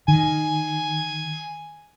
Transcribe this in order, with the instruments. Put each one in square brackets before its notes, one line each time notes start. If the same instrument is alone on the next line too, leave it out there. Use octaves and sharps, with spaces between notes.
[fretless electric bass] D#3 [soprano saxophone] G#5